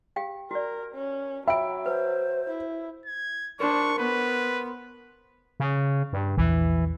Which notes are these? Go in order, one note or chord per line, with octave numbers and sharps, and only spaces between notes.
G4 F5 G5
F#4 A#4 D5
C#4
F#3 E5 G5 B5 D7
B4 C5
E4
G#6
D4 A#4 C5 C#6
B3 B4
C#3
G2
A#1 E2 E3